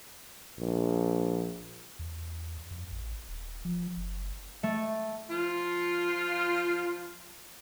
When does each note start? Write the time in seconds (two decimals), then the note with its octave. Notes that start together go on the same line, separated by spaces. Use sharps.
0.59 A#1
1.99 E2
2.71 F2
2.92 A1
3.29 D#1
3.65 F3
3.97 F#1
4.63 A3
5.30 F3 F4